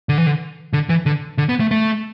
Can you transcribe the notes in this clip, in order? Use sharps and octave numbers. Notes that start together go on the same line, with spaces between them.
D3
E3
D3
D3
E3
D3
D3
B3
A3
A3